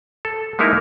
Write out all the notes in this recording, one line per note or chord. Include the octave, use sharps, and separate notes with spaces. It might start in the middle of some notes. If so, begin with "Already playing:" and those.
A4
G#3 A#3 D#4 E4 A#4 D#5